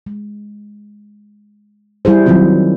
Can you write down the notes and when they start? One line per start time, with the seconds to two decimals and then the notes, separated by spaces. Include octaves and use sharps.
0.06 G#3
2.05 G3 E4 G#4 C5
2.26 D#3 F#3 G3 C4 F4